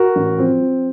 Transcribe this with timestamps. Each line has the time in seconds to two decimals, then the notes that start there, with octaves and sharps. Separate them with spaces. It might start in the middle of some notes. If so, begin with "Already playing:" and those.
Already playing: F#4 A#4
0.16 A1
0.39 F3 C4
0.61 F3